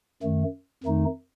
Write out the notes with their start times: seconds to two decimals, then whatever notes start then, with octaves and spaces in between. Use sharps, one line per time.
0.22 F#2 D#3 A3
0.84 F2 D#3 A3 D#4